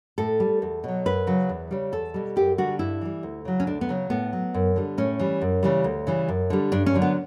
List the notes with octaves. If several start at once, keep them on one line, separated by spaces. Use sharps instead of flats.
A2 A4
G3
E2
B2 F#3
F#2 B4
C#3 F#3
E2
C#3 G3
E2 A4
B2 G3
F#2 G4
D3 G3 F#4
G2 E4
E3 G3
D2
C#3 F#3
C#4
D2 D4
B3
C#3 F#3
A2 B3
F#3
F#2
D3 G3
A2 C#4
E3 G3
F#2
C#3 E3 G3
D2
C#3 E3 G3
F#2
D3 G3
G2 D4
C#4
D3 F#3
B3